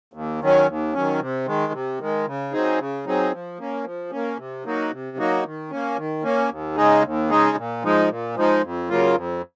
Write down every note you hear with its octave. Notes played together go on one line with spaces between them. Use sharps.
D#2
D#3 F#3 C#4
D#2
D#3 F#3 C#4
C3
D#3 G#3
C3
D#3 G#3
C#3
F#3 C4 D#4 G#4
C#3
F#3 C4 D#4 G#4
F3
A#3 C#4
F3
A#3 C#4
C3
F#3 A#3 D#4 F#4
C3
F#3 A#3 D#4 F#4
D#3
A#3 C#4
D#3
A#3 C#4
D#2
C#3 G#3 D#4 G#4
D#2
C#3 G#3 D#4 G#4
A#2
F3 G#3 D#4
A#2
F3 G#3 D#4
F2
C#3 F#3 A#3 F4
F2